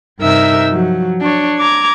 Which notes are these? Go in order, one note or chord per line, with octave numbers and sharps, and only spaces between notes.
G2 C3 D#4 A#4 E5 E6
F3 F#3
D4 C#5
A#5 D6 G#6